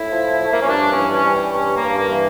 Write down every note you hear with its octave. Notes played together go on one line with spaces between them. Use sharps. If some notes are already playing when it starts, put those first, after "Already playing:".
Already playing: A2 E4
F3
F3 A3
A#3
C#4
G2 D4
C#4
E3
C#4
G3
G2 C#4
A#3
G2
A#3
E3